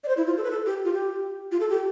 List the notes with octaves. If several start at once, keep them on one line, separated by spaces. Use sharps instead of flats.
D5
C5
E4
F4
A4
B4
A4
G4
F4
G4
F4
A4
G4